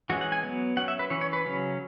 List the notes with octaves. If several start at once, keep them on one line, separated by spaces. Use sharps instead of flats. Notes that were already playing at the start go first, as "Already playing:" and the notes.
E3 G#3 C#4 F#4
F#5
G#5
F#3 B3
F#3 C#4 F#5
E5
B4
E3 C#4 C#5
C#5
B4
C#3 F#3 C#4